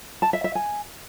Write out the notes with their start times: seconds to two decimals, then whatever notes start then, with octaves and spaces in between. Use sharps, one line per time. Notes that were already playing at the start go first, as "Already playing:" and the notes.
0.22 A5
0.33 E5
0.44 E5
0.55 G#5